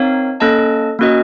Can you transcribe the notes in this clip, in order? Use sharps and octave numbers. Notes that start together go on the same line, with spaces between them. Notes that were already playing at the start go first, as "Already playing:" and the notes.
Already playing: C4 D#4 A#4 C#5 F5
A#3 C#4 A4 D#5 A5
A#3 C#4 F#4 A#4 D#5